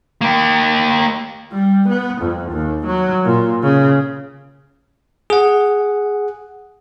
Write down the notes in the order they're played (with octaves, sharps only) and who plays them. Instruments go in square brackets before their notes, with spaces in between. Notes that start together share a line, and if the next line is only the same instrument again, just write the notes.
[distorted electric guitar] A#3 G4
[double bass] G3
B3
F2
D#2
F#3
A#2
C#3
[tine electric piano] G#4 F#5